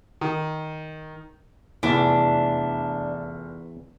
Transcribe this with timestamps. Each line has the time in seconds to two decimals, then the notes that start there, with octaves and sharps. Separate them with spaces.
0.21 D#3
1.83 F1 E2 E3 D4 B6